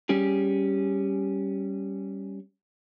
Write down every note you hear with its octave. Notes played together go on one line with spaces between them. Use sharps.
G3 C#4 G4 G#4